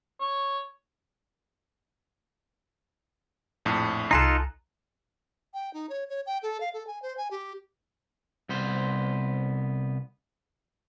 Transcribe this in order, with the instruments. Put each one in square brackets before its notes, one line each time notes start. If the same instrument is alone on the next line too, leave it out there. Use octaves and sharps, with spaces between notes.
[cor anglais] C#5
[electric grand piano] A#1 F2 A2
[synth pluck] C2 A#5 [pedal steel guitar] D#4 F4 A4 [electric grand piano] G#5 C6 F#6
[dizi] G5
D#4
C#5
C#5
G5
A4
F5
A4
G#5
C5
G#5
G4
[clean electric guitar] C2 B3 C5